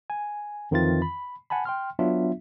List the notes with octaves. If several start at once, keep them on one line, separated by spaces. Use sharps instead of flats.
G#5
F2 D#3 E3 C4 F4 A6
B5
F#5 G#5 A5 B5
G5 C6 F6
F#3 B3 D4 F4 E5